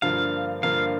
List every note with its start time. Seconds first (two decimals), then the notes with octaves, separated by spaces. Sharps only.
0.02 G2 D3 F3 A#3 F4 F5
0.63 G2 D3 F3 A#3 F4 F5